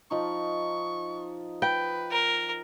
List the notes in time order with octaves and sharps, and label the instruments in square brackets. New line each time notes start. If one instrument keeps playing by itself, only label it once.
[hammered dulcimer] F3 D#4 [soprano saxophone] C#6
[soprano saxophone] B4 [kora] G5
[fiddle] A#4